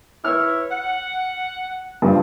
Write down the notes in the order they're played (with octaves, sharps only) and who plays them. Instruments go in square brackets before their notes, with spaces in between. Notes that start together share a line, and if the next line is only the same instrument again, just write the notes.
[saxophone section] E4 B4 C#5 [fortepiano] F6
[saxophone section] F#5
[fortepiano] G2 F3